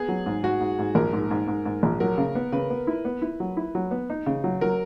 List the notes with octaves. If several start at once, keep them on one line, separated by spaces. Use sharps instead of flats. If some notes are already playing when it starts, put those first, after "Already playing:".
Already playing: B3 G#4
F#3
G#2
G#2 F#4
G#2
G#2
A#1 A#4
G#2
G#2
G#2
G#2
A#1
F#3 A#4
C#3
B3
C#3 B4
B3
E4
B3
E4
F#3
E4
F#3
B3
D#4
C#3
F#3
F#3 A#4